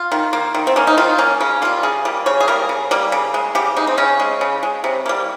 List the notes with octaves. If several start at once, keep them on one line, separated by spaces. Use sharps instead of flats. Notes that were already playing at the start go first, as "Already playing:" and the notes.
Already playing: F4
D#3
A#3
D#3
C4
A#3 C#4
D#4
D#3 F4
A#3 C#4
C#3 C#4
G3 A#3 F4
C#3 G#4
G3 A#3
C#3 C#5
G#4
G3 A#3 A#4
C#3
G3 A#3
C#3
G#3
C#3 G4
G#3 D#4
C4
C#3 C#4
G#3
C#3
G#3
C3
G3 A#3